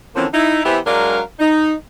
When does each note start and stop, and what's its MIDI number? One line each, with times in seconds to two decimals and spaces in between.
0.15 0.26 50
0.15 0.26 52
0.15 0.26 53
0.15 0.26 58
0.15 0.26 60
0.15 0.26 61
0.33 0.60 63
0.33 0.60 64
0.64 0.78 52
0.64 0.78 59
0.64 0.78 64
0.64 0.78 67
0.64 0.78 72
0.64 0.78 76
0.86 1.20 54
0.86 1.20 56
0.86 1.20 62
0.86 1.20 70
0.86 1.20 74
0.86 1.20 77
1.40 1.74 63